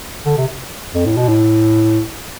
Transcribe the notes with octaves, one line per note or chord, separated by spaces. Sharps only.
D3
C3
F2
A2
B2
A2